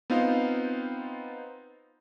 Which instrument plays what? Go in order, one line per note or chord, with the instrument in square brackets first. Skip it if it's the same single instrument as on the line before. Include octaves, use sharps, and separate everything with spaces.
[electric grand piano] B3 C4 D#4 F4 C5 F5